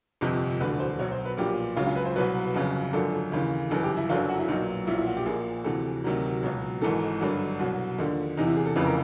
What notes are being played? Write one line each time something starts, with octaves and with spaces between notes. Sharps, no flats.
G1 F2 C3 F3
E1 D2 D3 B4
C5
B1 B2 F#3 C#5
C5
B4
B1 A#2 F3 G4
C#2 C#3 F#3 F4
F4
B4
C5
C2 B2 F#3 B4
G1 F2 C#3 F#3
G#1 F#2 D3 F3 A4
D#2 C#3 E3
G1 F#2 C#3 E3 A4
G4
E4
G1 F#2 D3 F#3 F4
F#4
E4
B1 A#2 F#3 D#4
B1 A#2 F3 E4
E4
F#4
G4
A#1 A#2 F3 G#4
D2 C3 E3 A4
D2 C3 D#3 F#3
C#2 B2 F#3
G#1 G#2 E3 A4
G#1 G2 D3 F#3
C2 B2 F#3
D#2 D3 F3
E2 C3 E3 D#4
E4
G#4
A4
F1 F2 C#3 E3 B4
A#4